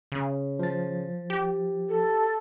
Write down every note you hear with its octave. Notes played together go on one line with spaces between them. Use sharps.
C#3
F3 A6
G4
A4